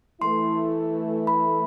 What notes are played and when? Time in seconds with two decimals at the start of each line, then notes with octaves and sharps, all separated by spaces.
0.21 E3 A3 E4 C6
1.27 B5